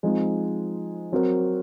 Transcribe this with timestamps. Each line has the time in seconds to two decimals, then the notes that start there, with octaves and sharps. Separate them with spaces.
0.03 F3 G#3 C4 D#4
1.12 F#3 C4 F#4 A#4